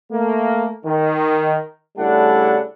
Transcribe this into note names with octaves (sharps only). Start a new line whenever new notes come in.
A3 A#3
D#3
C#3 G3 A3 D4 E4 F#5